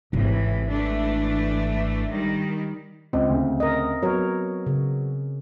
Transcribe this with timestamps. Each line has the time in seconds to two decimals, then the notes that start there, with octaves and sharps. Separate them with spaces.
0.13 G#1 A2 C3 E3
0.68 E3 A3 D4
2.09 D#3 G3
3.13 C#2 C4
3.29 D2 C#3
3.60 A#4 D#5
4.02 F#3 B3 A#4 C#5
4.67 C#3